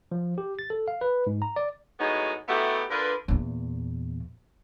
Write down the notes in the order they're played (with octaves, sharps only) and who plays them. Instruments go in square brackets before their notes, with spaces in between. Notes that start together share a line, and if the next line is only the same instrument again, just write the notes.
[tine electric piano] F3
G4
A6
A4
F5
B4
G#2
A#5
D5
[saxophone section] A2 F#3 G#3 B3 D#4
A3 B3 D#4 E4 F#4 G4
D3 D4 F4 A#4 B4
[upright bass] E2 A#2